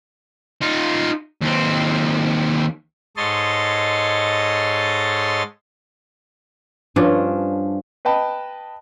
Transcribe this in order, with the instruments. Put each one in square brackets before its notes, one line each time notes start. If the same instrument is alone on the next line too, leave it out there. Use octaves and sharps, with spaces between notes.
[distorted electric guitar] D#4 F4
D#2 C4
[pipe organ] G#2 A4 C#5 D#5 C6 A6
[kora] G2 F3 C#4 D4
[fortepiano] B4 D#5 G5 A5 B5